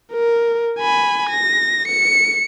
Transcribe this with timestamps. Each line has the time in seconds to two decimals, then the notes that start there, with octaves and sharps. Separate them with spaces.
0.12 A#4
0.79 G#5 B5
1.30 A#6
1.88 C#7